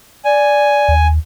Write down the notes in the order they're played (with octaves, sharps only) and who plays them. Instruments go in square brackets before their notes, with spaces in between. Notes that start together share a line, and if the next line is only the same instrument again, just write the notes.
[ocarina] D5 [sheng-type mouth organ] G#5
[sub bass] D#2